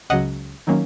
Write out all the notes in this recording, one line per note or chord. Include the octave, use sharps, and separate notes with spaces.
C#2 C#3 F#3 D#5 F#5
D#3 F#3 A#3 C#4